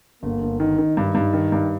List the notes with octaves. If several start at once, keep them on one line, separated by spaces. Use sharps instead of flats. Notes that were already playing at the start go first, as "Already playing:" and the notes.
G1 A#3
G1
D#3 D#4
D#3
G2 D#4
G2
D#3
G2